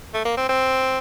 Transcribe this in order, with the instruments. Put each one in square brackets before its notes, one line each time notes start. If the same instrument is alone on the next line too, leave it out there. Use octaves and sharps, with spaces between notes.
[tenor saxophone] A3
A#3
C4
C4